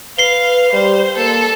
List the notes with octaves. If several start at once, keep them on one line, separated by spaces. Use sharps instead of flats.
B4 F5 C7 G7
G3 C5
A#3 A4